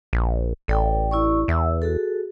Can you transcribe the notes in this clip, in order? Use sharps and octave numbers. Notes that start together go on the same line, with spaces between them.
A#1
A1 A4 D5 G5
E4 D5 C#6
E2 E5 E6
F#4 G#4 A4